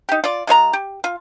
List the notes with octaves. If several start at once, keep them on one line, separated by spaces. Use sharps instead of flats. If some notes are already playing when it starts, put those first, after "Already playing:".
D#4 G4
F4 D5
G#3 F4 C#5 A#5
G4
F4